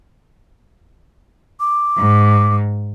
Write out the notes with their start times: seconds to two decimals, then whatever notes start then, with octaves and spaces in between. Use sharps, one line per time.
1.60 D6
1.97 G#2